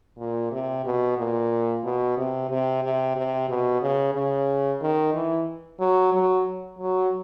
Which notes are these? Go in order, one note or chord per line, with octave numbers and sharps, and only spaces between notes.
A#2
C3
B2
A#2
B2
C3
C3
C3
C3
B2
C#3
C#3
D#3
E3
F#3
F#3
F#3